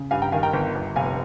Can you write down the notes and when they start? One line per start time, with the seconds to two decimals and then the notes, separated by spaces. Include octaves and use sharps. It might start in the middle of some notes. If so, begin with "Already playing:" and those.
Already playing: C#3
0.11 G2 F5 G#5
0.22 G5 A#5
0.32 D#3 F5 G#5
0.43 G5 A#5
0.53 G1
0.75 G1
0.96 F1 F5 G#5